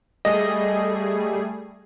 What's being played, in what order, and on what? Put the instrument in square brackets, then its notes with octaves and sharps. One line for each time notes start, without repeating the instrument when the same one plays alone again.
[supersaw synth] G3 A3 G#4 [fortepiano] D#5